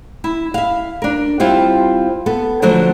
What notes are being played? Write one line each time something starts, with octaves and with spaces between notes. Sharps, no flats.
E4
E5 F5
D4 A#4
G3 C4 E4 F4 F5
B3 A4
D3 F3 F#3 A3 F#4 C5